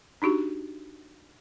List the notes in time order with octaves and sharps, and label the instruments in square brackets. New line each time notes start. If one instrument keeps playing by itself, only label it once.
[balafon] D4 D#4 F#4 G4